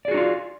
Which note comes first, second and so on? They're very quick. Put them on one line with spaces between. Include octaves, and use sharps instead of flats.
D5 G#4 F#4 D#4 F4